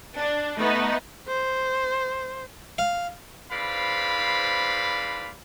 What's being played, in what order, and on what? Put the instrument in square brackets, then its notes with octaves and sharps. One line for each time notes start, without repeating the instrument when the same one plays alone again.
[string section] D4
A3 B3 D#4
[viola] C5
[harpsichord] F5
[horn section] G#2 B4 C5 D5 F5 B5